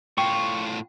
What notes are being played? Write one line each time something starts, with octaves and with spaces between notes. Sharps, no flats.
A2 F4 G5 C#6